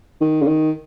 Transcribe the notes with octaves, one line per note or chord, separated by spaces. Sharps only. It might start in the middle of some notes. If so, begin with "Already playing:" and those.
D#3
C#3
D#3